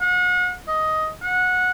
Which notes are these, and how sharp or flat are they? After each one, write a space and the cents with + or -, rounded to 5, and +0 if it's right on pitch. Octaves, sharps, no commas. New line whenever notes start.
F#5 -40
D#5 +10
F#5 -20